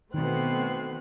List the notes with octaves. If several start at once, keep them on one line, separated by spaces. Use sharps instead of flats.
B2 D#3 E3 A3 C4 F#6